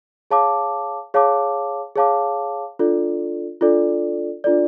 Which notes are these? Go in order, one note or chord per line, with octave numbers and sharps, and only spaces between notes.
G#4 C#5 F5 A5 D6
G#4 C#5 F5 A5 D6
G#4 C#5 F5 A5 D6
D4 F4 A4 D5
D4 F4 A4 D5
D4 F4 A4 D5